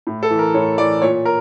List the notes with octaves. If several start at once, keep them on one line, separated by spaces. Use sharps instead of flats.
A2
A4
E3
A#4
A2 C#5
E3 D5
A#2 C#5
A#4